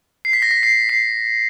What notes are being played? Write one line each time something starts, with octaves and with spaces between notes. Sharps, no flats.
C7
B6
A#6
B6
C7
C7